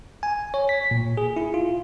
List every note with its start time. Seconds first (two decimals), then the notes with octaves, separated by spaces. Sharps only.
0.23 G#5
0.54 C#5
0.69 B6
0.91 A#2
1.17 G#4
1.37 E4
1.54 F4